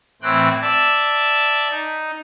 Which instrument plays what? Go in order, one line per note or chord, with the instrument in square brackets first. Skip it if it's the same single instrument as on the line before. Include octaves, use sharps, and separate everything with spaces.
[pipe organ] A2 E3 C4 G5 F#6
D5 E5 A5
D#4